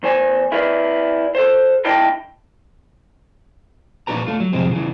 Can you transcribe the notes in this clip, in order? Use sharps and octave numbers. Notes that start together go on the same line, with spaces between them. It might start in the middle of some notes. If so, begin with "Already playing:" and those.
E2 C5 G#5
E4 A#4 B4 D5
A4 C5
D4 E4 A#4 D#5 G5 A5
A#2 D4 F#4 B4 A#5
A3 F4
F#3
F2 C3 F3 G#3 C4
C#3 E3